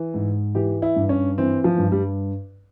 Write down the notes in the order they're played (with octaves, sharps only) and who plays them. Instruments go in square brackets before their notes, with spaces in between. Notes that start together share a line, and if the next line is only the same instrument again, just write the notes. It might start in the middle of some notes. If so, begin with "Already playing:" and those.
Already playing: [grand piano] E3
G#2
E3 G4
E4
G2
C#4
E3 C4
F3
G2
G3